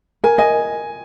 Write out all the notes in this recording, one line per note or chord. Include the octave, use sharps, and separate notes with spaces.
A#4 G#5
D#5 G#5